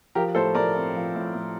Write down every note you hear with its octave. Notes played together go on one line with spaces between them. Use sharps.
F3 G4 A#4
A2 A4 C5
A2 A#4 D5
C4
F3
A2
A2